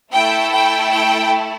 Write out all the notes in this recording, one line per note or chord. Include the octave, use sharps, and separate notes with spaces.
A3 E4 A4 G5
G5
G5